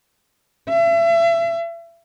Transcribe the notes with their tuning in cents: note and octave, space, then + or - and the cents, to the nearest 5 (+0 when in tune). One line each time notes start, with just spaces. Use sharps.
E5 +35